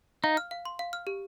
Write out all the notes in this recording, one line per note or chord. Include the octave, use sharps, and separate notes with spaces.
D#4 F5
F6
F5
C6
F5
F6
G4